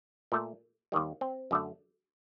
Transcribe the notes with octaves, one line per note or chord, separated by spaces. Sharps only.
A#2 A3
D#2 D#3 G3
C4
F#2 D3 A3